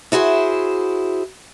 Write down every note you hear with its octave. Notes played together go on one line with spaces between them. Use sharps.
E4 F#4 G#4 C5